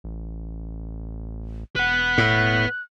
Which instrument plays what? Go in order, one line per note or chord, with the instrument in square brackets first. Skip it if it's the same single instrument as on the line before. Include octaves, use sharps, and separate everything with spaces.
[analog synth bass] A1
[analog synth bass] E1 [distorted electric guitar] B4 F#5 [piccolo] F#6
[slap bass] A2